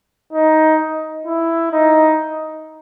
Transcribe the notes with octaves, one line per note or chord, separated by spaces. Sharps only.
D#4
E4
D#4